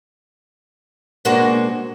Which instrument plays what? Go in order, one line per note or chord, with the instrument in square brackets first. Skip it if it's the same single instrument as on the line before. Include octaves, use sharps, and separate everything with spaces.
[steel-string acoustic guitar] B2 G#3 A#3 D4 F#4 C5